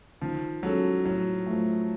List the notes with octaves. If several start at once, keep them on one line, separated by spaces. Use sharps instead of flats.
D#3 F3
F#3 G#3 C#4 F#4 A4
A2 F#3
F3 A3